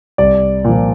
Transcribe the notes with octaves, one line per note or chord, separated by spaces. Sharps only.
C2 D5
A#2 F3